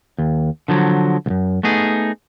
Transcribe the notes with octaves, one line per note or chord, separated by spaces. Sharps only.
D#2
D3 F3 F#3
C2 F#2
A3 B3 D#4 G#4